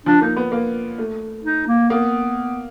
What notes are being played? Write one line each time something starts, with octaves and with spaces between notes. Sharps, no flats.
F3 D4
A#3 D#4
B3
A#3
A3
D#4
A#3
A#3 B3